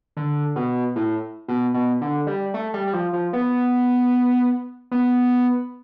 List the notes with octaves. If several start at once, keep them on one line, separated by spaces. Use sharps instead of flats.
D3
B2
A2
B2
B2
D3
G3
A3
G3
G3
F3
F3
B3
B3